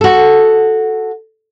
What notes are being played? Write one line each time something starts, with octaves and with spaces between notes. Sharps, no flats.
F#4 A4